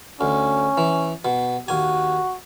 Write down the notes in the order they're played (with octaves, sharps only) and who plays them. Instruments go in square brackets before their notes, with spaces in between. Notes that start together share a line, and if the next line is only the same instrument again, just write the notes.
[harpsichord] D2 [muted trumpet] C#4
[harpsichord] E3
B2
[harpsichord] D#2 G#5 [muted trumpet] F#4